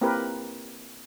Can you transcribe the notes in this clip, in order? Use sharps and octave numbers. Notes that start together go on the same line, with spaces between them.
A#3 C4 E4 G4 A#4 B4